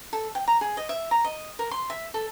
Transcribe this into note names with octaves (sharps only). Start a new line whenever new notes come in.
A4
G5
A#5
G#4
D#5
E5
A#5
D#5
A#4
C6
E5
A4